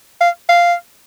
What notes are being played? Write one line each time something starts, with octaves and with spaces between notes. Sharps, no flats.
F5
F5